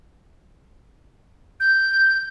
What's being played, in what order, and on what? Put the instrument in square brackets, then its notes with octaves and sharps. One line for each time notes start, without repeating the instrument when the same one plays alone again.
[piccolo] G6